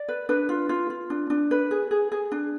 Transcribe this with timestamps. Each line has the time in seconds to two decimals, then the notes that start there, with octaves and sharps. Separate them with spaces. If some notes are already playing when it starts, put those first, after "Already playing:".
Already playing: D5
0.08 B4
0.29 D4 B4
0.49 F4
0.69 F4
0.90 F4
1.10 D4
1.30 D4
1.51 B4
1.71 G#4
1.91 G#4
2.12 G#4
2.32 D4